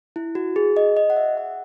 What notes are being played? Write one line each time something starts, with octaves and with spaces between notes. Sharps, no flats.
E4
F#4
G#4
D#5
D#5
F#5
E5
F#5